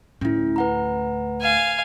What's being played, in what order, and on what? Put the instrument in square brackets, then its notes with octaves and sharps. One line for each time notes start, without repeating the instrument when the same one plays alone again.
[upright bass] D2 A2 [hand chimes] C#4 E4
[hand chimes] B4 F#5 A#5
[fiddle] F5 G#5